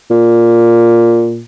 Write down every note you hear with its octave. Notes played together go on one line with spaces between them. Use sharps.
A#2